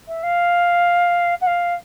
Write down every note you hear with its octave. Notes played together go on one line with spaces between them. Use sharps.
E5
F5
F#5
F5